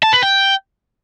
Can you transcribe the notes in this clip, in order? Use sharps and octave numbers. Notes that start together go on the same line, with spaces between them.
A5
B4
G5